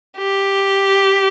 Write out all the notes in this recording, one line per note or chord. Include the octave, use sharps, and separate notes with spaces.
G4